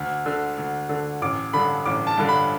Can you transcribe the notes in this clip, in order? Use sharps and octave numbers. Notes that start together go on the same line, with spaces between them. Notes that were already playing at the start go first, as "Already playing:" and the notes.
Already playing: D2
D3
D2
D3
A1 D6
G2 D3 B5
A1 D6
A5
G2 D3
B5